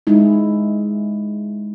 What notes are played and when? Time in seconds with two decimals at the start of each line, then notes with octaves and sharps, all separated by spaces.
0.07 G#3 D#4 E4